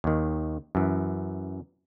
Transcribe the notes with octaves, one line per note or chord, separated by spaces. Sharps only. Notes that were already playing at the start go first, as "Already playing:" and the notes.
D#2 D#3
F#2 E3